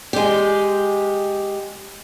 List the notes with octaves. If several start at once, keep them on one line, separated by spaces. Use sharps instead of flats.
G#3 G4